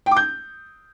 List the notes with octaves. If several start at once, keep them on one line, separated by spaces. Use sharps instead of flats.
G5
D6
G6